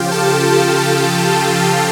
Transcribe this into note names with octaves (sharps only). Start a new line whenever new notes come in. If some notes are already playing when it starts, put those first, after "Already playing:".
Already playing: C#3 F3 F4 G4 F5 G5
A4 A5